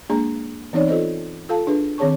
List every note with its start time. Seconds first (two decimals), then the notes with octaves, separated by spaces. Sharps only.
0.09 G#3 A#3 D4 G#4 A#5
0.73 E3 B3 C4 D#4 C#5 D5
0.88 F4 A4 C5 D#5
1.49 F4 A4 F5 A5
1.67 D4 G#4 B4
1.98 D#3 C4 G#4 C#5 A5 C#6